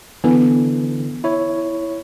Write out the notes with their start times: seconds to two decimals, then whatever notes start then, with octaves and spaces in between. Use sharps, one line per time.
0.24 D3 E3 B3
1.24 E4 C#5